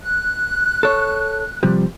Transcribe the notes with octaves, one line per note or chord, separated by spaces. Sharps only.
F#6
A4 C#5
C3 F3 G3